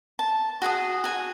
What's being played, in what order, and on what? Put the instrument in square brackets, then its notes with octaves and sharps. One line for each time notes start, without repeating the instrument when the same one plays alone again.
[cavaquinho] A5
F#4 G#4 G#5 D#6
F#4 G#5